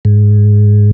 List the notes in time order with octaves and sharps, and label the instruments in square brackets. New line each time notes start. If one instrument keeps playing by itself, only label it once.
[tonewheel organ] G#2